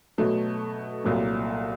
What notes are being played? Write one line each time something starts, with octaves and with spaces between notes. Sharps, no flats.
B2 F#3 A3
C2 A#2 F#3 A3